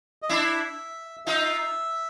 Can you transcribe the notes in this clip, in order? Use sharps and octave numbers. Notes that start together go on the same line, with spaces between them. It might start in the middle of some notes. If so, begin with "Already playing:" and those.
D#5
D4 E4 E5
D#4 F4 E5